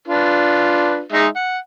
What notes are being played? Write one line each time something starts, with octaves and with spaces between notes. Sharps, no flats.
D4 F4 B4
G#3 D#4 E5
F#5